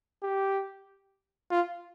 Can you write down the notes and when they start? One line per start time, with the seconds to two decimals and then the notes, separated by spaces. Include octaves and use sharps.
0.22 G4
1.51 F4